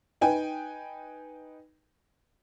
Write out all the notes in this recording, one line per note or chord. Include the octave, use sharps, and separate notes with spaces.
D#4 B4 G5 G#5